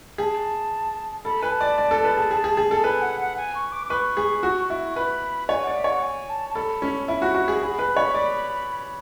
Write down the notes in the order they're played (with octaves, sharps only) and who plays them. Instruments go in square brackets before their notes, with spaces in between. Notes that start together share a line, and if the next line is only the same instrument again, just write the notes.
[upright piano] G#4 [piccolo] A5
[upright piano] A4 [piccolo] B5
[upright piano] B4 [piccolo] G#5
[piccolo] A5
[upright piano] D5
D5
A4
B4
G#4
G#4
G#4
G#4
[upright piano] A4 [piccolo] A5
[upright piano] B4 [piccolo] G#5
[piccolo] F#5
F#5
G#5
C#6
D6
D6
[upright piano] B4 [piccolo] C#6
[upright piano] G#4
F#4
E4
[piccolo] C#6
[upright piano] B4 [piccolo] B5
[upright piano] C#5 [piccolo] G#5
[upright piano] D5 [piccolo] F#5
[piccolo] E5
[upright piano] C#5 [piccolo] F#5
[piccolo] G#5
A5
A5
[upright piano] A4 [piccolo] B5
[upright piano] C#4
[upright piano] E4 [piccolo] B5
[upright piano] F#4
F#4
G#4
[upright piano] G#4 [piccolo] B5
[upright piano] B4
C#5
D5